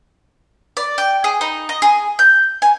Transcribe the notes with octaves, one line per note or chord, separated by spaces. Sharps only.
D5
G5
G#4
D#4
D#5
G#4
G6
G#5